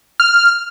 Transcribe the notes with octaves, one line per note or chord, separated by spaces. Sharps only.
F6